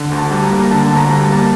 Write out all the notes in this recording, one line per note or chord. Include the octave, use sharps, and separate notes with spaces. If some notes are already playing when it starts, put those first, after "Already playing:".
Already playing: D3
D2
A5
G3
A#5
A#3
D3 A5
D2
A#5
G3
A5
A#3